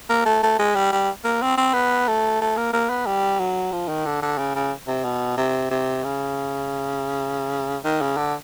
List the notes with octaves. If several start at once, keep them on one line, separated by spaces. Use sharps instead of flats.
A#3
A3
A3
G#3
G3
G3
A#3
C4
C4
B3
A3
A3
A#3
A#3
B3
G3
F#3
F3
D#3
D3
D3
C#3
C#3
C3
B2
C3
C3
C#3
D#3
C#3
D3